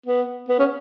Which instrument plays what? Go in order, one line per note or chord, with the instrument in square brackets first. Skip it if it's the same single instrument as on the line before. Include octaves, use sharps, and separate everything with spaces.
[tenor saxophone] B3
B3
C#4